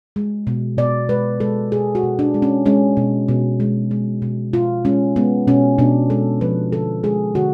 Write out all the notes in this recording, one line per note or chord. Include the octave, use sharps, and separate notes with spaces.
G#3
B2
B2 D5
G#3 B4
G#3 A4
B2 G#4
F#4
B2
D4
G#3
C#4
G#3 C#4
B2
B2
G#3
G#3
B2
B2 F4
G#3 C#4
G#3 B3
B2 C#4
B2 D4
G#3 A4
F3 B4
D3 A4
G#3 G#4
D3 F#4